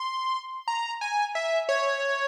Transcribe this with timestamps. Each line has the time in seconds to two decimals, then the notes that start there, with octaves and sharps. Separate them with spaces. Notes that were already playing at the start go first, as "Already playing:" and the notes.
Already playing: C6
0.68 A#5
1.01 G#5
1.35 E5
1.69 C#5